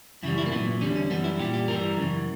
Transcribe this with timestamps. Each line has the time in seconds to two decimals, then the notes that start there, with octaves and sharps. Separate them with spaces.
0.23 F#2 C#3 E3 G3 E4
0.38 E4
0.46 A#3
0.52 A#2 F#3 B3
0.81 E2 D3 G3 C#4
0.96 C#4
1.10 F#2 E3 G3 B3
1.24 E4
1.39 A#2 G3 G4
1.54 G4
1.68 G2 E3 G3 A#4
1.97 F#2 C#3 E3